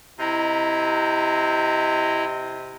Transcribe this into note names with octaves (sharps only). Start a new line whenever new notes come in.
C3 E4 D#5 A#5